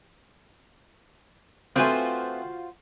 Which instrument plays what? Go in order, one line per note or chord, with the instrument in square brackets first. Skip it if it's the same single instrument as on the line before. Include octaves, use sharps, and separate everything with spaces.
[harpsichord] F3 A3 [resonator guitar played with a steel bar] C4 B4 G#5 [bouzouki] F4 F#4 C5